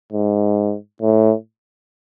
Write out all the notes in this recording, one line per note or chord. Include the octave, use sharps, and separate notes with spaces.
G#2
A2